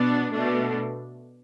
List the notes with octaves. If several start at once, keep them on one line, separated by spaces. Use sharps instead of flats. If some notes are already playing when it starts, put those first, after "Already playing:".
Already playing: B2 B3 D4
B2 A3 D4